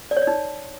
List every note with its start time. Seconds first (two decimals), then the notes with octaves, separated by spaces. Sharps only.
0.11 D5
0.17 C#5
0.22 D5
0.27 D#4